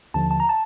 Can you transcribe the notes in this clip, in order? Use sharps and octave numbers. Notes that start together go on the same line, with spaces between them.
D#2 D3 F3 A5
A5
A#5
A5